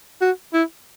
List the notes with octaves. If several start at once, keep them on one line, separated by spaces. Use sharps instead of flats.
F#4
E4